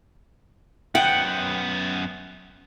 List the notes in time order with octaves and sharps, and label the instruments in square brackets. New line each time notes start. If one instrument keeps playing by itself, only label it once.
[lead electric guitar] F#2 B3 [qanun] F#5 G5